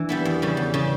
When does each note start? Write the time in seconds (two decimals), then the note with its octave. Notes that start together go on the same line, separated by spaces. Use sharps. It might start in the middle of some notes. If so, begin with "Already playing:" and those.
Already playing: E3 D4
0.09 G3 B3 E4
0.25 E2
0.42 C#3 G3
0.57 E2
0.74 C#3 G3